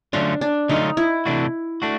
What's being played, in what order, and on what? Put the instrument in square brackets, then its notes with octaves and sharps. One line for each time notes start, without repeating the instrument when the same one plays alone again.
[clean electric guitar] D3 F#3 A3 C#4 F4 [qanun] D4
[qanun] D4
[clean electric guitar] D3 F#3 A3 C#4 F4 [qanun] D#4
[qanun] E4
[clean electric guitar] C3 E3 A3 D4 F#4
A3 D4 F#4